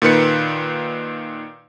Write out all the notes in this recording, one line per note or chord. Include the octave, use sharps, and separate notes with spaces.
A#2 D#3 B4 C#7